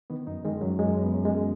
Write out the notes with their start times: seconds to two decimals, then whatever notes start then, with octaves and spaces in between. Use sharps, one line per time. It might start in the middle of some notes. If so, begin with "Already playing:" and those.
0.10 D#3 B3
0.27 F#2 D#4
0.44 D#3 G#3
0.61 F#2 F#3
0.79 F#2 G#3
0.97 F#2
1.02 B3
1.14 F#2
1.25 G#3